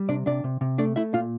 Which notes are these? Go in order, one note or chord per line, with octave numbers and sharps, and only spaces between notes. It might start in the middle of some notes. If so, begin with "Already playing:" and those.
Already playing: G3
C3 D4 D5
C3 D4 D5
C3
C3
A3 D4 D5
A3 E4 E5
A#2 F4 F5